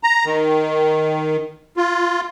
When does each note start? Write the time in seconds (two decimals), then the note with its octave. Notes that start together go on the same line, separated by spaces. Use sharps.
0.03 A#5
0.25 D#3
1.77 F4